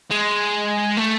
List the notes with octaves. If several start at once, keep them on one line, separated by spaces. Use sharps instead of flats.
G#3
A3